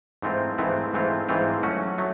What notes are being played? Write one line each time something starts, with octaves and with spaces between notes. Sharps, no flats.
G#2 E3 A3 C4 F4
G#2 E3 A3 C4 F4
G#2 E3 A3 C4 F4
G#2 E3 A3 C4 F4
F#3 A3 C#4 F#4
F#3 A3